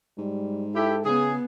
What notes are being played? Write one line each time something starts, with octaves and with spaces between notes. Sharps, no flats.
G#2 G3
E4 G4 A4
C#3 B3 G#4